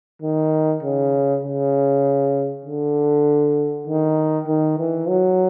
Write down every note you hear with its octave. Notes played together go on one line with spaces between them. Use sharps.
D#3
C#3
C#3
D3
D#3
D#3
E3
F#3